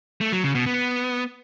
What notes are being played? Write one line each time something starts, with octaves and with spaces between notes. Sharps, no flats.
A3
F#3
C#3
B2
B3